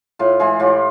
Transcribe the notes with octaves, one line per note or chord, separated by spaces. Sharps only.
A2 F4
E3 G#3 F4
A2 F4 G4